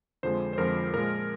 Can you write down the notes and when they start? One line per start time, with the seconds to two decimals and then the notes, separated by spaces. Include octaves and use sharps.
0.23 F2 D3 F3 G#3 C5
0.53 C5
0.58 F2 D3 F3 G#3 A#4
0.94 A#2 F3 G#3 A#4